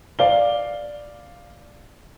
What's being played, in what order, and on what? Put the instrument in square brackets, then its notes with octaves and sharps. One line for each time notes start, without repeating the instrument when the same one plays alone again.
[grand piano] D5 F5 G7